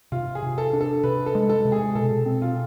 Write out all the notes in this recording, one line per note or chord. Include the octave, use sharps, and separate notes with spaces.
C3 F4
G#4
C3
A4
D4
A4
C3 B4
A4
G#3
A4
C3
G#4
B2 A4
C4
F4